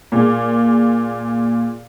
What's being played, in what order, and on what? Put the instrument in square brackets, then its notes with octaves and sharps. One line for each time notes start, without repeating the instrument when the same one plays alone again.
[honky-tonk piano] A#2 G#4